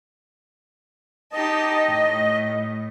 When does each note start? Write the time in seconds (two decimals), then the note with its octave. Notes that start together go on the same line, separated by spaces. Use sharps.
1.32 D#4 G4 D#5 A5
1.88 A2